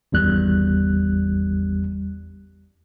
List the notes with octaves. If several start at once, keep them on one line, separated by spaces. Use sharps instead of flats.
G#1 E2 G3 F#6